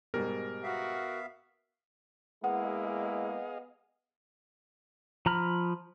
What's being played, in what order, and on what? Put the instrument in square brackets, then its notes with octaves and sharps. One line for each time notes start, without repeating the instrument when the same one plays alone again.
[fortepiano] G#2 B2 G3 [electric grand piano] A#4
[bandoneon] B3 E5 F5 [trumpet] F#4
[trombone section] G#3 A#3 E4 [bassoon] B3 [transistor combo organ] G#4 D#5 F5 [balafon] F#5
[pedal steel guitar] F3 A#5 B5 F6